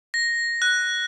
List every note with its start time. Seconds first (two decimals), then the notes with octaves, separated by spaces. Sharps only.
0.14 A#6
0.62 F#6